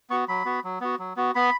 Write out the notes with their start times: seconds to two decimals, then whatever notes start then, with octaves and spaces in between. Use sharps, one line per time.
0.10 B3 F#4 C#6
0.29 F#3 B5
0.45 B3 F#4
0.64 F#3
0.81 B3 F#4
0.99 F#3
1.17 B3 F#4
1.35 B3 B5